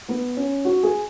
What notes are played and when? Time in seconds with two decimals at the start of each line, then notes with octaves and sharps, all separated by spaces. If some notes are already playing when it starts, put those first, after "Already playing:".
0.09 B3
0.37 C#4
0.65 F#4
0.83 G#4